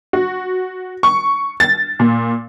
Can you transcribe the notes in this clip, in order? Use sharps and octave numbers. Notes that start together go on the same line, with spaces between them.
F#4
C#6
A6
A#2